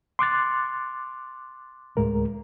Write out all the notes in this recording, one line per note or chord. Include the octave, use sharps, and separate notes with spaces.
C6 D6 F#6 A6
D2 A2 G#3 A#4